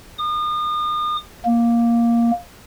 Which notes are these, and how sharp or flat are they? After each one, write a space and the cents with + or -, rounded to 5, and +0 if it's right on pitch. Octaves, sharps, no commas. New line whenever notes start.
D#6 -40
A#3 +5